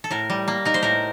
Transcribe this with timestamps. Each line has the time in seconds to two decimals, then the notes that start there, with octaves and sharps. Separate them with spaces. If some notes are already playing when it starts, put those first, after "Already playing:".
0.04 A4
0.11 A2 A#4
0.30 G3
0.48 A#3
0.65 D#4 A#4
0.74 C5
0.83 A2 A#4